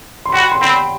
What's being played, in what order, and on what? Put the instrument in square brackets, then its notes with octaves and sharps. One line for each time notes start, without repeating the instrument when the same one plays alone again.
[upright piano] C6
[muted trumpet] F#4 [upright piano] G5 B5
[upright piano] C6
[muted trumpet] C4 [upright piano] G5 B5